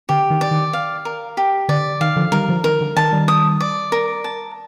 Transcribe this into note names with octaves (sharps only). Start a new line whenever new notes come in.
D3 G4
D#3
D5
D#3
F5
A#4
G4
D3 D5
D#3 F5
D3 F3
D#3 G3 A#4
D3 F3
D#3 A#4
D3
D#3 A5
D#3 G3
D#6
D5
A#4
A5